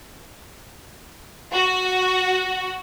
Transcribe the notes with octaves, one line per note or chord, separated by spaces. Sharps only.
F#4